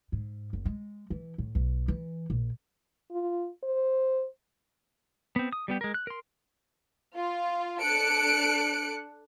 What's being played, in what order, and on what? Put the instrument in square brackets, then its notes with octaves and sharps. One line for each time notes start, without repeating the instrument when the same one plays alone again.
[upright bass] G#2
F#1
G#3
E3
A2
B1
E3
A#1
[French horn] F4
C5
[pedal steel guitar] B3 C4
D#6
G3 B3 G4
G#3 A#4
F#6
A#4 C6
[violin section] F4
D4 A4 F#6 C#7 D7